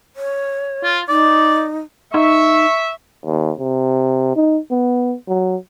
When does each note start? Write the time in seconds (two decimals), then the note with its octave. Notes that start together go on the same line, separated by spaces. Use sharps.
0.16 C#5
0.84 F4
1.08 D#4 D5
2.14 D#4 E5 C#6
3.26 D#2
3.60 C3
4.36 D#4
4.71 B3
5.28 F#3